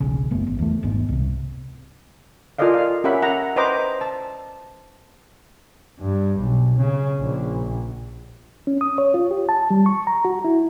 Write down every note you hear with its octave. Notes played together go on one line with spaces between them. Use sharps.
E1 B1 C#3
F#1 A3 B3
G#1
E2 A3
D#1 G#1 G#2 B3
C2 C3
F4 A4 A#4 D5 D#5 F5
F5
C#4 G4 A#4 E5 F#5 B5
F#5 A#5
B4 C5 D#5 G5 A#5 D6
A5
G2
B1
C#3
A#1
C#4
D#6
C#5
F4
G4
A5
G3
C#6
A#5
F#4
E4